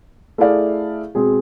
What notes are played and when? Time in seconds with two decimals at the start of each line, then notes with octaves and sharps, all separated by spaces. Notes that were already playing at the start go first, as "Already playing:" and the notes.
0.38 A3 E4 G#4 D5 F5
1.15 B2 G#3 C4 G#4